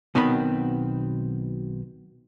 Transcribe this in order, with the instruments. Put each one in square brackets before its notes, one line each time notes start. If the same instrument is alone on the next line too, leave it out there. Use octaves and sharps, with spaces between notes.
[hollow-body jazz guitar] B1 B2 D#3 B3 C4 B5